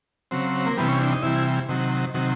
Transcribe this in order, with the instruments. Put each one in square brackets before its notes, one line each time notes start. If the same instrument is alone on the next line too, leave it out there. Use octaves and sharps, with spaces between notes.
[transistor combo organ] C#3 F#3 C4
A#3
C3 E3 G3 B3
C#4
D4
D#4
C3 E3 G3 E4
C3 D#3 F#3
C3 D#3 F#3